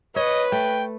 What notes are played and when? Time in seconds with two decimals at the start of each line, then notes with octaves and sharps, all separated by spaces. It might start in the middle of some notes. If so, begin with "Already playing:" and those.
0.16 B4 C#5 D#5
0.52 A3 G5